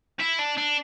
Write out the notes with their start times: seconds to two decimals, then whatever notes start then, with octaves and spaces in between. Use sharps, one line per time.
0.20 E4
0.38 D4
0.57 D4